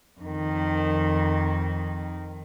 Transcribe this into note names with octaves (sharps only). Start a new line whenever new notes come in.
F2 D#3